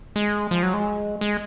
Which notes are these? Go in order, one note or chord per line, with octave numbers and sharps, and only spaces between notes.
G#3
F3
F#3
G#3
G#3